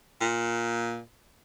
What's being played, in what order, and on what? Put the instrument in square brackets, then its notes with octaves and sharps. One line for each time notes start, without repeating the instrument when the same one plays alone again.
[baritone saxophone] A#2